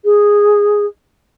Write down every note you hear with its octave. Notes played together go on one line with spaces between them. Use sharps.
G#4